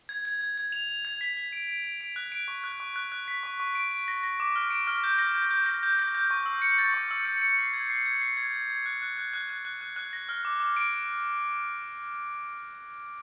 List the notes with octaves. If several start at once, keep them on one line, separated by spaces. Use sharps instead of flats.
G#6
G#6
G#6
G#6
F7
F7
G#6
B6
B6
D7
D7
D7
D7
F#6
D7
C#6
F#6
C#6
F#6
F#6
B6
C#6
C#6
D7
D7
A#6
A#6
D6
F6
D7
F6
G6
A#6
G6
G6
A#6
G6
A#6
G6
C#6
E6
C#7
A6
C#6
E6
C#7
C#7
C7
G#6
C7
G#6
C7
G#6
G#6
G#6
F#6
F#6
F#6
F#6
F#6
F#6
F#6
F#6
A#6
F6
D6
D6
D7
D7